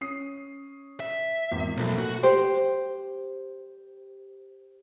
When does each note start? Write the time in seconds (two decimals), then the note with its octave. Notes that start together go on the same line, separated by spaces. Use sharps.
0.01 C#4 D#6 C7
1.00 E5
1.51 G#1 E2
1.77 B1 F3 A3 A#3
1.99 F#4
2.23 G4 C5